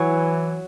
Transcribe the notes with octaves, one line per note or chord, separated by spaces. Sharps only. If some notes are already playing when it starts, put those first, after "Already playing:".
Already playing: E3 F#3 C#5